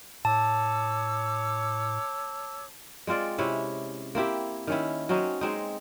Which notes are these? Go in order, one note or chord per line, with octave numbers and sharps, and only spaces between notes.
A2 C#5 A5 D6 E6
G#3 C4 F4 D5
C3 C#4 E4
A#3 C4 E4 G4
D#3 C#4 E4
F#3 C4 C#4 D#4
G#3 C4 D#4